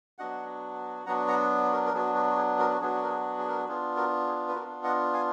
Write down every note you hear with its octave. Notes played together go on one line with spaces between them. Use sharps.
F#3 B3 D4 F#4 D#5 F#5
F#3 B3 D4 F#4 F#5 A#5
F#5 A#5
F#4 A#4
A#4
F#3 B3 D4 F#4 G#4
F#4
F#4
G#4
F#4 A#4
F#4
F#3 B3 D4 F#4 G#4
A#4
G#4
G#4
A#4
G#4
B3 D4 F4 G#4
F#4 A#4
G#4
B4
B3 D4 F4 F#4 A#4
D#5 F#5
F5 G#5